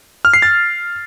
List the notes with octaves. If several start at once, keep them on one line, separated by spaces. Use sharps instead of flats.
F6
C7
A6